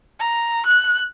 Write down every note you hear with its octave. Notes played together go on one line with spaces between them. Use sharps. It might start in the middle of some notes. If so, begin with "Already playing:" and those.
A#5
F#6